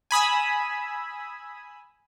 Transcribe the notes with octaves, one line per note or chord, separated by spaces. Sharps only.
G#5 B5 D#6 E6